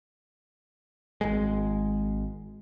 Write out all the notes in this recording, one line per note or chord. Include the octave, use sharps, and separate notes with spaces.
G#1 G#3